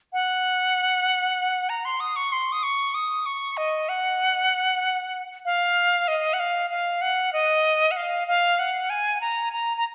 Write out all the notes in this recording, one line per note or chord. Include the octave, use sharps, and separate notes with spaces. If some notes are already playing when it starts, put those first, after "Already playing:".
F#5
A#5
C6
D#6
C#6
C6
D#6
C#6
D#6
C#6
D#5
F#5
F5
D#5
F#5
F5
F5
F#5
D#5
F#5
F5
F5
F#5
G#5
A#5
A#5
A#5